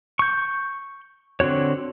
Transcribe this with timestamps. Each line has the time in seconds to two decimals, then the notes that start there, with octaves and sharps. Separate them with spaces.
0.19 C#6 G6
1.40 D3 C4 F#4 C#5